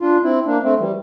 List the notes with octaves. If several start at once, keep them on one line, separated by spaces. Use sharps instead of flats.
D4 F4
C4 E4
A#3 D4
A3 C4
E3 G3